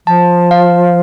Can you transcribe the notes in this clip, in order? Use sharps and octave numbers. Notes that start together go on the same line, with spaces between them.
F3 A5
F5